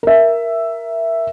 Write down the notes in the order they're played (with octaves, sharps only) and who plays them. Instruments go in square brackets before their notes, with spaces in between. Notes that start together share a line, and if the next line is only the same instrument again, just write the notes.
[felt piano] A#4 E5